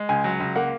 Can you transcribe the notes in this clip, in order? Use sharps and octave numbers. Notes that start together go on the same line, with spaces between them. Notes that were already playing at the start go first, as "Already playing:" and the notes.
Already playing: G#3
C#2 G#5
F#3
C#2
A#3 F#5